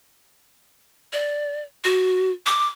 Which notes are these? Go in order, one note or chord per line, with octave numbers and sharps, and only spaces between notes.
D5
F#4
D6